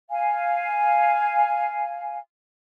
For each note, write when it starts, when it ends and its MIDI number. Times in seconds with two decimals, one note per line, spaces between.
0.11 2.17 77
0.11 2.17 80